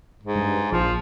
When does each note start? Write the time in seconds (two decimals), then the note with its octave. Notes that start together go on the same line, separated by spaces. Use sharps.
0.24 G#2
0.35 G2
0.72 A#1 F3